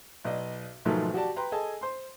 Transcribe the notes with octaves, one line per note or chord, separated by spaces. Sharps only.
B1 D5 D#5
B1 G#2 D#3 F3 F#3 A3
F#4 G4 D5 A5
B4 G5 A#5 C6
G#4 A4 D#5 G#5 A5
C5 C6